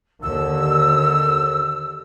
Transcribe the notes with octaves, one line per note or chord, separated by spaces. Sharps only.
D#2 D3 E6